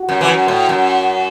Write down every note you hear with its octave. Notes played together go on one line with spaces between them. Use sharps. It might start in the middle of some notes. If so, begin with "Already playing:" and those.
Already playing: F#4
F#2
E3
F#2
A2
F#2